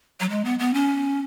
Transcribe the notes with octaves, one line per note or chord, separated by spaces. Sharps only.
F#3
G#3
B3
B3
C#4